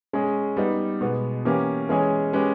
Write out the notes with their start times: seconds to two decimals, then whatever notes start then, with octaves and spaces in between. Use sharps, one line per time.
0.13 G#3 C#4 G#4
0.57 G3 B3 D#4
1.01 B2 G#3 B3
1.45 E3 A#3 C#4 G4
1.89 E3 G#3 C#4 G#4 C#5
2.33 G#3 C#4 G4 B4